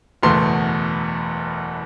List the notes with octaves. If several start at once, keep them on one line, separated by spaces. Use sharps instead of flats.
F#1 E2 B2 A3 C6